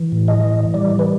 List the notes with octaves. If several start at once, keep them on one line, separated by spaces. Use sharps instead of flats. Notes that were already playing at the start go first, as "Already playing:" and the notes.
Already playing: E3
A2
D#5
E3
G3 D5
B4